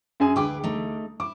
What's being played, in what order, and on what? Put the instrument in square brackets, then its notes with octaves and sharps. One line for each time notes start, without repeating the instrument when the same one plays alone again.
[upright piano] F#2 G#4 G#5
[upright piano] D2 D6 [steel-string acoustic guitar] G#4 B4 G5
[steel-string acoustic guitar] A3 D#4
[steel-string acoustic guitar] E4 [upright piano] D6